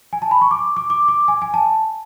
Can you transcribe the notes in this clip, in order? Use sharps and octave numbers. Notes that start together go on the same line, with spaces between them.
G#5
A5
B5
C#6
D6
D6
D6
D6
G#5
G#5
A5